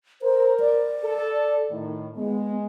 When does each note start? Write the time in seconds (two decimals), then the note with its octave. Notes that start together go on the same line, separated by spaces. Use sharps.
0.22 A#4 C5
0.60 D5
1.03 A4
1.70 A2 D#3
2.16 G#3 B3